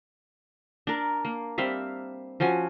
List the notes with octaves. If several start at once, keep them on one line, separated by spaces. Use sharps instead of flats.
D4 A#4
A#3
G3 C4 E5 F5
F3 C#4 F#4 G#5